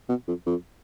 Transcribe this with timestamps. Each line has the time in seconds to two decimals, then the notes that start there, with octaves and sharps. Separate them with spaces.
0.09 B2
0.28 F2
0.47 F2